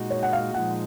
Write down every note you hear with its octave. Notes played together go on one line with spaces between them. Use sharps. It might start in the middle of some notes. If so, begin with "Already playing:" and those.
Already playing: A#2 G#3 D#4 F#4
C#5
F#5
F5
A#2 F3 G#3 D#4 F#5